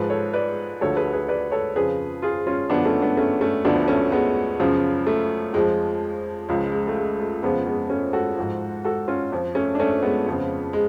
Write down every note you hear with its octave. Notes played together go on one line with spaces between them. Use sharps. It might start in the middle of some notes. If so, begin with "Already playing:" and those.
Already playing: G#2 F3 G#4 B4
A4 C#5
B4 D5
D2 D3 F3 A4 C#5
G#4 B4
G#4 B4
B4 D5
A4 C#5
F2 C#3 F3 G#4 B4
F4 G#4
C#4 F4
F#2 D3 F3 B3 D4
A3 C#4
B3 D4
A3 C#4
A3 C#4
D2 D3 F3 B3 D4
A3 C#4
G#3 B3
F#2 C#3 F3
A3
F2 F3 G#3
C#2 C#3 F3 G#3
G#3
A3
G#3
A3
F2 C#3 F3 G#3 B3
G#3 B3
A3 C#4
F#4 A4
G#2 F3
F#4 A4
C#4 F4
F2 F3
A3 C#4
D4
A3 C#4
G#3 B3
F2 C#3 F3
G#3